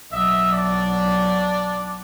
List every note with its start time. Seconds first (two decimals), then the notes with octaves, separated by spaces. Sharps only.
0.11 B1 F#3 D#5 E5
0.50 D4 D5